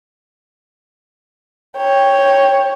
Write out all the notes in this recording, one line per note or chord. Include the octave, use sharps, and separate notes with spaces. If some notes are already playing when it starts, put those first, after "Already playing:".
C#5 G5